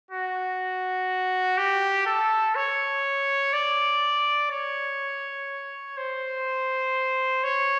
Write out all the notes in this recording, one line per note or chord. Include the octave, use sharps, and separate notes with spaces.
F#4
G4
A4
C#5
D5
C#5
C5
C#5